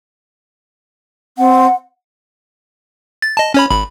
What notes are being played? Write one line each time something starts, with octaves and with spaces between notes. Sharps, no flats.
C4 F#5
A6
D#5 A5
C#4 C#5 B5
G#1 B5